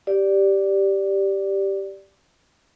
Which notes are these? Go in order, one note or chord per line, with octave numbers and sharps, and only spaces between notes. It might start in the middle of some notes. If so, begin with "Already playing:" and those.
G4 D5